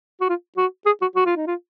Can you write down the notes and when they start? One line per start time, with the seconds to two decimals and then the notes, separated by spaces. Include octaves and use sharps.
0.21 F#4
0.29 F4
0.57 F#4
0.86 G#4
1.01 F#4
1.15 F#4
1.26 F4
1.36 D#4
1.47 F4